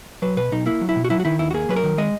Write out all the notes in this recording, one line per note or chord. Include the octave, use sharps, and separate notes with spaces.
F#3 B4
B2 B4
B1 D#4
A#3 E4
F#3
E4
B2
F#4
F#3 E4
F#4
D#3 E4
D#2 E4
F#4
A#3 G#4
F#3 B4
A#4
D#3
G#3 D#5